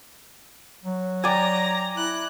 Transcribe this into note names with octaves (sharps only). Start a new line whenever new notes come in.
F#3
D5 G5 G#5 A#5 A#6
E4 F#6